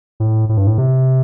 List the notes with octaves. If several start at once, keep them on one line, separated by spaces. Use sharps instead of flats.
A2
A2
G2
A2
C3